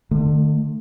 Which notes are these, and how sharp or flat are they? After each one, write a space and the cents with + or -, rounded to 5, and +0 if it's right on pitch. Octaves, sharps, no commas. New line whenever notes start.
D3 +35 A3 +0